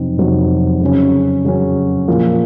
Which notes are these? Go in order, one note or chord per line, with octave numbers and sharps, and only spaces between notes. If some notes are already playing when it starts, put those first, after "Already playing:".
Already playing: F2 C3 F#3 C4 D#4
F2 C3 F#3 C4 D#4
C#3 F#3 C#4
C#3 F#3 C#4
A#2 F3 A#3